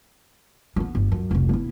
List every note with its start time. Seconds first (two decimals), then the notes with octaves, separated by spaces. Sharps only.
0.76 A#3 B3
0.95 G1
1.12 F#2
1.31 F1 C2
1.49 B3 E4